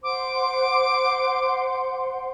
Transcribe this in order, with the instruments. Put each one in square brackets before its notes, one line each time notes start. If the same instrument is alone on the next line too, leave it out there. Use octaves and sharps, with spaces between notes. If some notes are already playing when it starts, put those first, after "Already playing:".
[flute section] C5 F#5 C6 [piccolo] D6